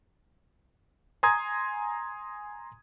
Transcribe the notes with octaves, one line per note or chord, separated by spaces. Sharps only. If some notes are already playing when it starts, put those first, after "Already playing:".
G#5 A#5 C6 D#6 G#6